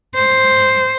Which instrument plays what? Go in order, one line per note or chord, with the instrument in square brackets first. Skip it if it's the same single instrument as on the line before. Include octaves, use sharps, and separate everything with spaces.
[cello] C5